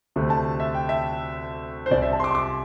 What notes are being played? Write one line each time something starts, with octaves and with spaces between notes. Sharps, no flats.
D2 C3 A3
A5
E5
G5
E5
C5
C2 C3 G3 D5
E5
A5
C6
D6
C6
D6